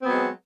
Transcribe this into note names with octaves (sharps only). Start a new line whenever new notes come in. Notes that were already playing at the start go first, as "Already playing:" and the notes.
F#3 G#3 B3 C4